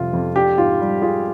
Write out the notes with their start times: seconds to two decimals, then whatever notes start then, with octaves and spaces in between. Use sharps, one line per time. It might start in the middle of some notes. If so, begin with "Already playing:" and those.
Already playing: F2 C3 G3 F4
0.13 F2
0.36 D4 G4
0.58 G#2 F4
0.80 G3
1.02 F4 G#4